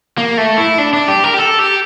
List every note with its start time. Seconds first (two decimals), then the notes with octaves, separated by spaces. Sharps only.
0.18 A#3
0.38 A3
0.58 E4
0.78 D4
0.93 D4
1.08 G4
1.24 A#4
1.34 G4
1.38 A4
1.59 G4